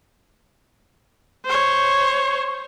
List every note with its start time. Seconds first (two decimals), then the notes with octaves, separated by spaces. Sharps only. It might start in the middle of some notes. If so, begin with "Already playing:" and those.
1.45 C5 C#5